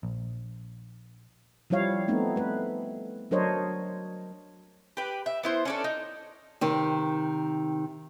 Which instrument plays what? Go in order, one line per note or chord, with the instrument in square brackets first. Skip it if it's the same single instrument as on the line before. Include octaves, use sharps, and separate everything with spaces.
[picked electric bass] A#1
[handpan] F3 G3 E4 C#5 F5
A3 B3 C4 D#4
A3 B4
F#3 D4 A#4 C5 C#5 D#5
[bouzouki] G4 B4
E5
B3 E4 C5
C#4 D4 A4
D#4
[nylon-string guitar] C3 D#3